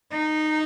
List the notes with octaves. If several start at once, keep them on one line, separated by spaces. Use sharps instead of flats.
D#4